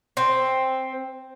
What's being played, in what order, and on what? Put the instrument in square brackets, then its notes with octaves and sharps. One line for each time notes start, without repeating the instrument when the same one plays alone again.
[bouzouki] C4